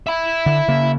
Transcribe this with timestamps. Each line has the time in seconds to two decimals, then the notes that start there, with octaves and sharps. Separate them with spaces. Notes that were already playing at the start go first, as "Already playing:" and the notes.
0.07 E5 B5
0.46 D3
0.68 C#3 A#3